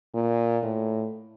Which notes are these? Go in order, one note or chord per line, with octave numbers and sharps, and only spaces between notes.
A#2
A2